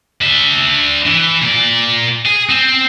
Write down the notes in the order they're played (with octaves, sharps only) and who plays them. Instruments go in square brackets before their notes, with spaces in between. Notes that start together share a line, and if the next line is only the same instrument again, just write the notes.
[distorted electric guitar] D4 E5
E3
A#2 D5
G#4
C4